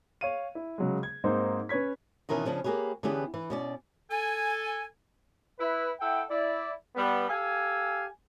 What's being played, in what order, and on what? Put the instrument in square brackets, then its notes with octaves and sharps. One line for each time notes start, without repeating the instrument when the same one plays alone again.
[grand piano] C#5 F5 D#7
E4
C#3 F#3 G#3
G#6
G#2 A#3 C4 D#4 C5
C#4 B4 C#5 G#6 B6
[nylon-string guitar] B2 D#3 E3 C#4 A#4
C#3 F3 C#4 D4
A#3 G4 G#4 B4 C#5
D3 E3 B3 C#4 G4 G#4
E3
B2 C#4 D5
[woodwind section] A4 G#5
[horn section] E4 B4
E4 A4 F#5 G5
E4 D5
G3 B3
G4 A4 F5 G#5